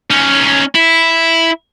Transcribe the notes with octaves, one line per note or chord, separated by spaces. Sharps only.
C#4 D#4
E4